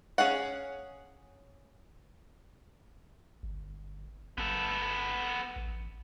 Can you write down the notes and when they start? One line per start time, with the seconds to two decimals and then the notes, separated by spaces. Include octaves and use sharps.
0.18 C#4 G#4 F5 F#5
3.43 G1
4.38 G1 B3 A4
5.56 A1